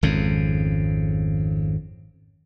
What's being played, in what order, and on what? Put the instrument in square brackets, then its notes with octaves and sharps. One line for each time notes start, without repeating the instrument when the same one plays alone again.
[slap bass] G#1 F2 C#3